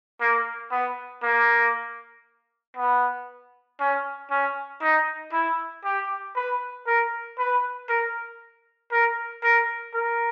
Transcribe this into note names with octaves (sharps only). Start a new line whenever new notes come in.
A#3
B3
A#3
B3
C#4
C#4
D#4
E4
G4
B4
A#4
B4
A#4
A#4
A#4
A#4